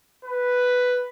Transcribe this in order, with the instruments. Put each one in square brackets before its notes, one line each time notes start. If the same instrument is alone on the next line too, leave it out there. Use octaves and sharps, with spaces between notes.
[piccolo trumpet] B4